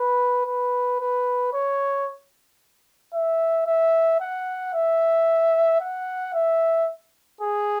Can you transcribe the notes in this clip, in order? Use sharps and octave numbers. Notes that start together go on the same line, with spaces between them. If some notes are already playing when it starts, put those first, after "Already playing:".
Already playing: B4
B4
B4
C#5
E5
E5
F#5
E5
F#5
E5
G#4